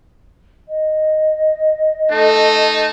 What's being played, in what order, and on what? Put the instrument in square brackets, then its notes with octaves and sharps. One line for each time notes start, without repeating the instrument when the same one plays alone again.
[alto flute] D#5
[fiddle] A3 A5 [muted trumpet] D#4